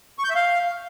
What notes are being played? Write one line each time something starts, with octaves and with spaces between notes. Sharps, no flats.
C#6
G6
E5
F5